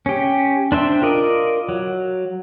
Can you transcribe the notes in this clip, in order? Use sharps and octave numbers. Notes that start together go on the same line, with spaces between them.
C#4 G4
D4 C5 E5 G5
F4 A#4 D5 D#5
F#3